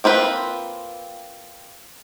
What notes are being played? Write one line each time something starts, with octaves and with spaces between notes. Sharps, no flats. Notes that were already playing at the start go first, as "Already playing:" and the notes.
A#3 C4 F4 B4